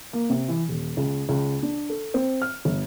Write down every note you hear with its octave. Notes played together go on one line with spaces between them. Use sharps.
A#3
C3
E3
D#1
C#2
C#2
D4
A4
C4
F6
G1